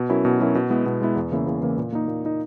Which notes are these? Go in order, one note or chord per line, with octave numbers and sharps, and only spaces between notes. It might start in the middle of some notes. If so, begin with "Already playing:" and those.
Already playing: B2
F#3 C#4 E4 A#4
B2
F#3 C#4 E4 A#4
B2
G#3 B3 E4
B2
G#3 B3 E4
E2
C#3 E3 A#3 E4
E2
C#3 E3 A#3 E4
A#2
A#3 D#4
A#2
A#3 D#4